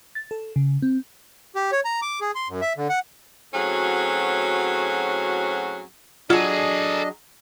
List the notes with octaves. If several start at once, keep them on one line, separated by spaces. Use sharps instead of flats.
A6
A4
C#3
C4
G4
C#5
A#5
D6
G#4
C6
F#2
E5
D3
F#5
A2 F#3 C4 C#4 F#4 G#4
F#3 D4 F4 G#4 A4 D#5 G#5